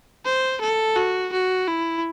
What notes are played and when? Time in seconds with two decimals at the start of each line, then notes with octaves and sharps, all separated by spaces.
0.25 C5
0.61 A4
0.96 F#4
1.33 F#4
1.68 E4